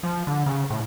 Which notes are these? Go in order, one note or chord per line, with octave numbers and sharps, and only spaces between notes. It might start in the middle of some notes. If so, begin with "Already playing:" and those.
F3
D3
C#3
A2